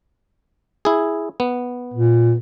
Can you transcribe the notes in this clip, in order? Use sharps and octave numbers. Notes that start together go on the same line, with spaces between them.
E4 G#4
B3
A#2